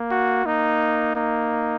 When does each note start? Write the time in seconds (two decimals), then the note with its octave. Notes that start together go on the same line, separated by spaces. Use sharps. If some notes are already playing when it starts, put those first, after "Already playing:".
Already playing: A#3
0.11 F#4
0.45 A#3 D#4
1.15 A#3 D#4